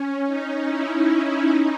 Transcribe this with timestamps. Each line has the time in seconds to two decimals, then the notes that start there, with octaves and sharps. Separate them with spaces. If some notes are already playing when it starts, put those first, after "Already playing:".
Already playing: C#4
0.27 D#4
0.67 E4
1.07 E4
1.47 D#4